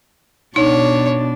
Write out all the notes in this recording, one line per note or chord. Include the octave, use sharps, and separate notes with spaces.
B2 D4 D#4 C#5